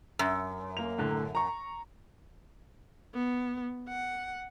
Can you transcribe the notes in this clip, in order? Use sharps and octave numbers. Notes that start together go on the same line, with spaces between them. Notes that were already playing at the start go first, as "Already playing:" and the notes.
F#2
A#3 F7
A2 D3
A#5 C#6
B3
F#5